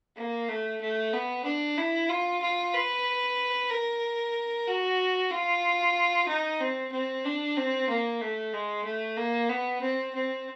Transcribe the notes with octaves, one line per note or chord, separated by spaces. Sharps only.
A#3
A3
A3
B3
D4
E4
F4
F4
B4
A#4
F#4
F4
D#4
C4
C4
D4
C4
A#3
A3
G#3
A3
A#3
B3
C4
C4